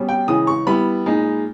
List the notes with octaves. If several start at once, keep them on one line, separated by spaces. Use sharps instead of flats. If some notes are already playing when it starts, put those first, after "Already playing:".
Already playing: B2 G3 C#4
G5
C#3 E3 G#3 D#6
C#6
G3 B3 E4 B5
A#2 G#3 D#4